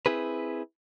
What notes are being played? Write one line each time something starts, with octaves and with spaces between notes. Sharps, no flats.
C4 E4 G#4 B4